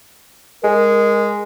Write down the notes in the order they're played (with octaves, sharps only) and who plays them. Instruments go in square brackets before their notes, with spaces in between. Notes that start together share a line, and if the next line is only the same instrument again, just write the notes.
[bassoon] G#3 [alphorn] A#4